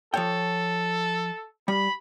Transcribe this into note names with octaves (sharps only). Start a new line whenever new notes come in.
F3 A4 C#5 G5
G3 B5